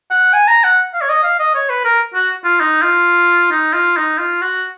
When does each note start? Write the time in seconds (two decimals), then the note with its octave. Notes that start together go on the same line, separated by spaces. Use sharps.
0.11 F#5
0.33 G#5
0.48 A#5
0.64 F#5
0.94 F5
1.01 C#5
1.09 D#5
1.23 F5
1.40 D#5
1.55 C#5
1.70 B4
1.85 A#4
2.14 F#4
2.45 F4
2.60 D#4
2.82 F4
3.52 D#4
3.74 F4
3.97 D#4
4.18 F4
4.42 F#4